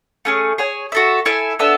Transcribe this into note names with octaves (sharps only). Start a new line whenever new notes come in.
A3 C#4 G#4
G#4 C#5 G#5
F#4 A4 E5
E4 A4 E5 G#5
B3 D4 A4 E5